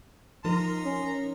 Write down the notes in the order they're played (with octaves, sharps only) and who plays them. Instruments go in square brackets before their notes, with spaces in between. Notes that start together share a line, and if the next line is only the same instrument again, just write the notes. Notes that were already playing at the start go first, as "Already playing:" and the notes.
[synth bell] F3 D#4 A#4 [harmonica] A#5 C6
[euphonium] C#4